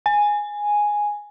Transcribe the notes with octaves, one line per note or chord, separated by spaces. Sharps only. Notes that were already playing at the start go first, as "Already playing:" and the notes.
G#5